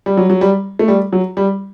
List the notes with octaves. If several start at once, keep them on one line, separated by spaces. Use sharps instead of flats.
G3
F#3
F#3
G3
A3
G3
F#3
G3